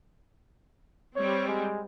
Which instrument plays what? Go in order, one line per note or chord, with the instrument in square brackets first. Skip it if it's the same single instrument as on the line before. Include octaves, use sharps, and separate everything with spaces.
[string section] G3 C4 [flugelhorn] C#5
[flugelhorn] G#3